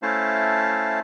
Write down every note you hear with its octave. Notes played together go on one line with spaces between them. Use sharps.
A3 C#4 E4 C5 F5 A5